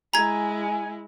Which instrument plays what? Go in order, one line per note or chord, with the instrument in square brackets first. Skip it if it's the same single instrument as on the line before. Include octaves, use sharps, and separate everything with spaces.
[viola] G#3 E4 [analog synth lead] G#5 [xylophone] A#5 G#6